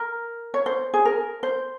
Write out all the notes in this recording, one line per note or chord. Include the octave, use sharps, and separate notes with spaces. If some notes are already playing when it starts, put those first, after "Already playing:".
Already playing: A#4
C#5
C5
G#4
A#4
C5